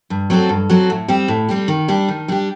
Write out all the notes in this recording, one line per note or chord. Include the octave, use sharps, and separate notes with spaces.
G2
F#3 C4 F#4 A4
G2
F#3 C4 F#4 A4
A2
G3 C4 G4
A2
G3 C4 G4
D#3
G3 D4 G4
D#3
G3 D4 G4